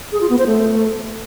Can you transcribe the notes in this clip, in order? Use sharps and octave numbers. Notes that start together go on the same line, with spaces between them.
G#4
F4
B3
C5
A3